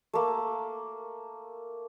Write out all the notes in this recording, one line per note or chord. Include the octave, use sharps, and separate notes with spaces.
A3 A#3